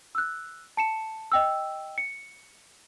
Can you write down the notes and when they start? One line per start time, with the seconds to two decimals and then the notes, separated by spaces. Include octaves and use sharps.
0.15 E6 F#6
0.77 A5 C#7 E7
1.32 D#5 G5 E6
1.98 C#7